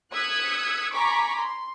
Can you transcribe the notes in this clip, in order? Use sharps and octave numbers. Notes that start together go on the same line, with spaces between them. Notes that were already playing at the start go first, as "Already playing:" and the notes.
D#6 E6 F#6 G#6 B6 C#7
G#5 A#5 B5 C#6 D6 B6
C6